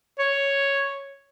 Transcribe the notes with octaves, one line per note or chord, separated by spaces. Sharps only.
C#5